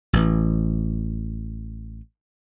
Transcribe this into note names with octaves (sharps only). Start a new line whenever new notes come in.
A1 E3